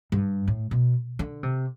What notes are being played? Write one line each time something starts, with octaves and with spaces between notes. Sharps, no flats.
G2
A2
B2
D3
C3